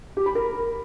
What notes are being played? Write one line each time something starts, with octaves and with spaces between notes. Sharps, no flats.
G4
B5
A#4